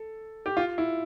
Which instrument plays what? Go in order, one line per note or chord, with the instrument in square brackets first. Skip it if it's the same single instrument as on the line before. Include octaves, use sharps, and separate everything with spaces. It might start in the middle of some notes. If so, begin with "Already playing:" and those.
Already playing: [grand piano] A4
G4
F4
E4